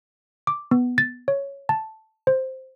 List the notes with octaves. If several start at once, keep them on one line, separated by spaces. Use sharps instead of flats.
D6
B3
A6
C#5
A5
C5